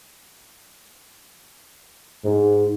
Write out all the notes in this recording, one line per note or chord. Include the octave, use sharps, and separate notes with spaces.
G#2